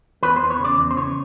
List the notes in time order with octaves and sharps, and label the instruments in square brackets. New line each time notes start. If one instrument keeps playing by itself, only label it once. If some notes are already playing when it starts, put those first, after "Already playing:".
[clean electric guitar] E2 B4
E2 C5
C#5
C#3 D5
E2
C5
C#3 C#5